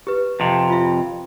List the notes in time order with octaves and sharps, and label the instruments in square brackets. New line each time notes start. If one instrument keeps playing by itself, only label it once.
[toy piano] G4 B4
[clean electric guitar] F2 C3
[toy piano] F4 E5